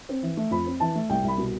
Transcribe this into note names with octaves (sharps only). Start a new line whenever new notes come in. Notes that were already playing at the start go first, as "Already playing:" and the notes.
C4
E3
A3
F2 B5
C4
E3 A5
A3
C2 G5
C2 B5
B2